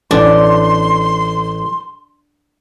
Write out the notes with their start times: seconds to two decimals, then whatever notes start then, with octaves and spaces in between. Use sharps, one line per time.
0.11 A1 D4 C6